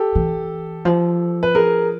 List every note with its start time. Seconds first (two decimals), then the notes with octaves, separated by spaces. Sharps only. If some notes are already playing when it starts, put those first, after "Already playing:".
Already playing: G4 A4
0.15 E3
0.85 F3
1.43 B4
1.55 G#4 A#4